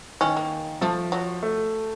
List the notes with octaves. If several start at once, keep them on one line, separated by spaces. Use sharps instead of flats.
D#3 C#4
A#3
F3 A3
F#3
A3